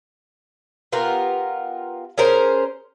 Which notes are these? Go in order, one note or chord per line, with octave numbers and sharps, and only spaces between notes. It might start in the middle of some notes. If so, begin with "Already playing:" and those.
B3 F4 G4 A#4
C#4 G#4 A#4 C5